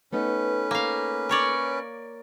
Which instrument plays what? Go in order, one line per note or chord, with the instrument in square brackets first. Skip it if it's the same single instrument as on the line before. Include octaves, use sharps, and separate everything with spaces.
[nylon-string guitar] A3 B3 D#4 [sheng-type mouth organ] C#4 B4
[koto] A#3 F5
A#4 C#5 D5